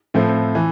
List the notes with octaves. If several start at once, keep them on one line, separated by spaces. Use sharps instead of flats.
A2 F3 A3 C4
E3